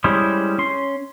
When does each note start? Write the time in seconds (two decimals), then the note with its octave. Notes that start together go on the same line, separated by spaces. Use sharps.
0.04 G3 G#3 C#4 E4 C5
0.58 C#4 C6